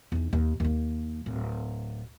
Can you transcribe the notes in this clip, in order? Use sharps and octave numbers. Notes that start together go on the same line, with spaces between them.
E2 D#4
D#2
D#2 A#3
D1